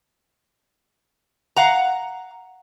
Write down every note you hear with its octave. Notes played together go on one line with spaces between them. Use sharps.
F5 F#5 A#5